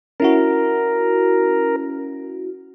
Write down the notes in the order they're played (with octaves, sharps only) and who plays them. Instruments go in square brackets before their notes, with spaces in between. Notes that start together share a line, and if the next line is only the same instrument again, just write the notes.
[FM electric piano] C#4 E4 F#4 [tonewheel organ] A#4